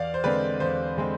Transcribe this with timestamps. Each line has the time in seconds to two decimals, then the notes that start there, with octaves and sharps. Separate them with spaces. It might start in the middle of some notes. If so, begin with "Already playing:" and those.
Already playing: E2 D5 F5
0.14 C5
0.24 D3 G#3 C4 B4 D5
0.60 E2 C5
0.97 D3 G#3 C4